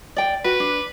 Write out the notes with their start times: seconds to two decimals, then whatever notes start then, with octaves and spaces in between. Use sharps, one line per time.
0.16 D5 G5
0.45 F#4 B4
0.60 D4